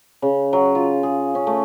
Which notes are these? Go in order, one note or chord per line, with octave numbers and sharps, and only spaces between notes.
C#3
F#3
F4
G#4
C#4
A3